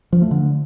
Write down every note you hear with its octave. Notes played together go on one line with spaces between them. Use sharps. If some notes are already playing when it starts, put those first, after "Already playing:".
F3
A3
D3